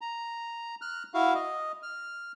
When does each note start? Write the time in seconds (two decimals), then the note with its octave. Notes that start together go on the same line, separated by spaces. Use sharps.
0.01 A#5
0.81 F6 F#6
1.14 E4 F#4 F5
1.35 D#5
1.83 F6